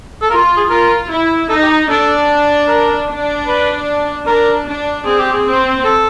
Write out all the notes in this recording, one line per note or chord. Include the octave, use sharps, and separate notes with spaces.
A4
F4 A#4
G#4
F4 A#4
E4
D#4 A4
G4
D4 A4
A#4
D4
B4
D4 A#4
D4
C4 G#4
G4
G#4
C4
A4